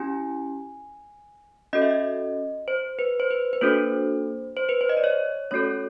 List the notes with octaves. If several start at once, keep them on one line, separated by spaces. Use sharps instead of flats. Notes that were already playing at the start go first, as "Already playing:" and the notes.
Already playing: C#4 E4 G4 G#5
C#4 F#4 A4 D#5
E5
D#5
C5
B4
C5
B4
B4
A#3 D4 F#4 A4 C5
C5
B4
C5
D#5
D5
C#5
A3 C#4 F#4 A4 C#5